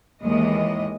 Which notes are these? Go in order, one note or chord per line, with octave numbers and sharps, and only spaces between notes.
D#2 E3 G#3 A#3 D#5